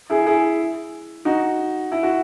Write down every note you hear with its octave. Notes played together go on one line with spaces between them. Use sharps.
E4 G#4
E4 G#4
D#4 F#4
E4
F#4